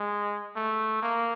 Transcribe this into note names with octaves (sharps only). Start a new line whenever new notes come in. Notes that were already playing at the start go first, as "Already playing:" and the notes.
Already playing: G#3
A3
A#3